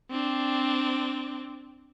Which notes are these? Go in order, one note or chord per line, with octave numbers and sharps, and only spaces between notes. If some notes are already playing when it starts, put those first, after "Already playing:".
C4 D4